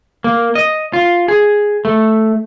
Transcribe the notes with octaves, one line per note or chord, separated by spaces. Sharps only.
A#3
D#5
F4
G#4
A3